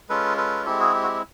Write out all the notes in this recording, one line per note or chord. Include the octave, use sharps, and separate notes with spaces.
G#3 C#4 F4 A4 B4
A4 B4
G#3 C4 E4 G4 A4
F#4 G#4
G4
F#4
G4